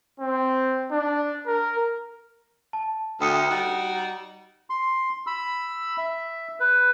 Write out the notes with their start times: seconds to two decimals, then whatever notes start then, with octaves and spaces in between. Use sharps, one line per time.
0.20 C4
0.92 D4
1.47 A#4
2.73 A5
3.21 D2 G5 D#6 C#7
3.51 G3 D#4 F#4
4.70 C6
5.27 B5 E6
5.98 E5
6.60 B4